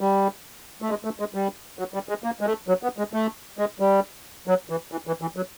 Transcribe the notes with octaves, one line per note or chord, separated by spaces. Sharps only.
G3
A3
G#3
A3
G#3
G3
F#3
G3
G#3
A#3
G#3
A3
F#3
B3
G#3
A3
G#3
G3
F#3
E3
E3
E3
E3
F#3